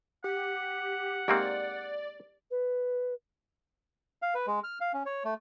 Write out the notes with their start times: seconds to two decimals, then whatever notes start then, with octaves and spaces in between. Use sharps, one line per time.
0.24 G4 F#5
1.28 G#2 A#3 C4 G4 D5
2.51 B4
4.22 F5
4.34 B4
4.47 G#3
4.64 F6
4.81 F5
4.93 C#4
5.06 C#5
5.25 A3